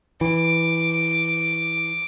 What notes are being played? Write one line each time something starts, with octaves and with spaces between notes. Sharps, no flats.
E3 D6